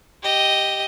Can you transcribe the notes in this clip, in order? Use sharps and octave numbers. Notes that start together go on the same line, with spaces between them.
G4 D#5